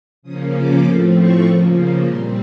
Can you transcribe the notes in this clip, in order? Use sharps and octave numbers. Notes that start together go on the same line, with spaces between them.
C#3 F3 A#3 C#4 D#6
D6
A2 F3 A3 C4
C#6
C#3 F3 A#3
A#2 G3 C4 C6